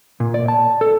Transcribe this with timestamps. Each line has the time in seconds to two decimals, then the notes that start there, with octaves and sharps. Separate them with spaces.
0.20 A#2
0.34 D5
0.48 A5
0.81 A4